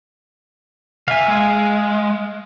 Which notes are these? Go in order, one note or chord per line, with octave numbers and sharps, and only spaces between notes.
D2 E5 F5 G#5
G#3